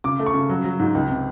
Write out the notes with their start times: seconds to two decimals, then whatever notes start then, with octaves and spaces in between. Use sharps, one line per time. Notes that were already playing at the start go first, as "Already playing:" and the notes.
0.04 C#3 D6
0.19 A3
0.26 C#6
0.34 C#3
0.49 F#3
0.64 F#3
0.80 G#2
0.94 C#2
1.10 C3